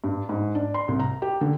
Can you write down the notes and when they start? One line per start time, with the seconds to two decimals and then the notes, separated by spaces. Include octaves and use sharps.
0.04 G2
0.29 G#2
0.55 D4
0.74 C6
0.88 C2
1.00 A#5
1.22 G4
1.41 D3